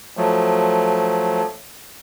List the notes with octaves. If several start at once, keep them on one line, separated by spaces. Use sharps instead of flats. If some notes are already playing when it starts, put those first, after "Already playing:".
F3 F#3 A3